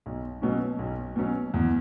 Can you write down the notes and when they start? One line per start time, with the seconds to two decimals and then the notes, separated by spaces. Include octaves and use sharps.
0.06 B1
0.42 B2 F#3 C#4
0.79 B1
1.16 B2 F#3 C#4
1.54 E2